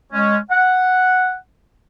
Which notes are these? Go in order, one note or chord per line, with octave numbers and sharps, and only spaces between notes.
G#3 C#4
F#5